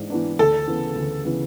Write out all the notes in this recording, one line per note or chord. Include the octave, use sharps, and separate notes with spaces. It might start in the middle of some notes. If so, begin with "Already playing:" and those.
Already playing: G#2 E3 D4
E3 B3 D4
D2 A4
C#3 E3 B3
D2
C#3 E3 B3